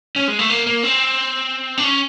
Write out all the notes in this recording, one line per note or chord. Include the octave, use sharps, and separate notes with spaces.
C#4
G#3
A3
A#3
A#3
C4
D4
C#4